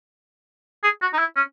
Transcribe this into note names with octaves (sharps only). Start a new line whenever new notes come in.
G#4
F#4
D#4
E4
C#4